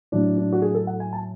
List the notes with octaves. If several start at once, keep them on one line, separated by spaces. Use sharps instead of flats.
A2 F#3 D4
D4
F#4
G#4
A4
F#5
G#5
A5